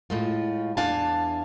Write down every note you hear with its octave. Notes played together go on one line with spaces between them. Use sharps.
A2 G#3 F4
E2 D4 F5 G#5 A5